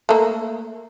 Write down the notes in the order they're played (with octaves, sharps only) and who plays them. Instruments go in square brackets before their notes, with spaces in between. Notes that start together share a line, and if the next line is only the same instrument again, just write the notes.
[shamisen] A3 A#3